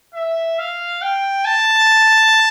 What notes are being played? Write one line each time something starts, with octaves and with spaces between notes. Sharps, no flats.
E5
F5
G5
A5